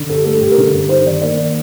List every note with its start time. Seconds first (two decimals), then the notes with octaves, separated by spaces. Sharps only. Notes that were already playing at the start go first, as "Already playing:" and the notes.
Already playing: D3
0.09 G2 A4
0.25 A3 A4
0.41 G2 G4
0.52 A#4
0.58 D3 A4
0.74 G2
0.89 D#4 C5
1.05 D#3 D5
1.22 A#3 D5
1.38 D#3